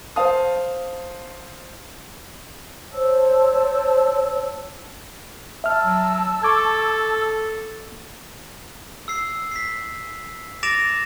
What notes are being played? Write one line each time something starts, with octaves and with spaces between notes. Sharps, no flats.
C5 F5 A5 D#6
C5 C#5 A5 E6
E5 A5 E6 F6
F#3
A4 C#6 D6 G#6
E6 C7
B6 C7
D6 A6 A#6 D7 E7 F7